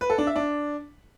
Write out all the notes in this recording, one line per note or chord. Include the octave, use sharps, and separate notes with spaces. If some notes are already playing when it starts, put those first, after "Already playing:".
B4
A4
D4
E5
D4